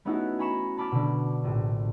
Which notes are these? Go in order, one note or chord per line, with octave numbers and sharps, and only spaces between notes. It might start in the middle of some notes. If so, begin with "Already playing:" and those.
A3 B3 C#4 D#4 E4 F#4
G#5 A#5 B5 C#6 C#7 E7
A5 B5 D6 F6 A6
B2 D3
A#1 A2